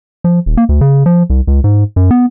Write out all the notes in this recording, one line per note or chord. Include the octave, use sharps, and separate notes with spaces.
F3
D#1
A#3
D2
C#3
F3
C2
C#2
G#2
F#2
B3